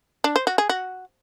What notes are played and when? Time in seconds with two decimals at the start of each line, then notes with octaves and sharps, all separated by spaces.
0.24 D4
0.36 C5
0.47 F#4
0.58 G#4
0.69 F#4